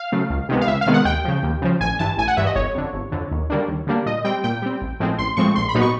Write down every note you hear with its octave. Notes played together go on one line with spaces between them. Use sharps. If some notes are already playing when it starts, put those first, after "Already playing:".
Already playing: F5
C#3 F#3 A3
C#2
C3 D#3 G#3 B3
F5
C#2 E5
F5
C3 D#3 G#3 B3
F#5
D#2 G5
C#3 F3
D#2
C#3 F3
A1 G#5
G2 E3 A5
A1 G#5
F#5
G2 E3 E5
D#5
G1 C#5
F2 D3
G1
F2 D3
D#2
D3 G3 A#3 D4
D#2
D3 G3 A#3 D4
A#2 D#5
G3 C4 G5
A#2 G5
G3 C4
A1
A2 F3 G#3 C4
A1 C6
A2 F3 G#3 C4 C#6
A#1 C6
B5
A#2 F#3 B3 D#4
C#6